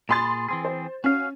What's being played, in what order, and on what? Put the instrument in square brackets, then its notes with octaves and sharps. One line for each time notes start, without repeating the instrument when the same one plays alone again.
[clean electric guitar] A#2 G#4 [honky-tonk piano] B5 C6 A6
[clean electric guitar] E3 C4 G#4
[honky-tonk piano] C5
[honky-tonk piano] C#4 [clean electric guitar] F#4 F5